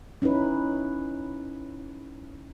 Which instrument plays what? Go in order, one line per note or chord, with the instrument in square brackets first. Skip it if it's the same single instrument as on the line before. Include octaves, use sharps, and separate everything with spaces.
[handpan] C#4 D#4 E4 B4